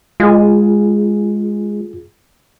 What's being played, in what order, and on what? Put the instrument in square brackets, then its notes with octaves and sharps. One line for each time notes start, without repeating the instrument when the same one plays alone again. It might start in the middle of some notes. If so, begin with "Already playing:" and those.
[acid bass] G#3 [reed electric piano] F4 G#4